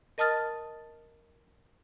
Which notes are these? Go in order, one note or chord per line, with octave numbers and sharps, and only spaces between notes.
A#4 D#5 A5 D#6 F6 A6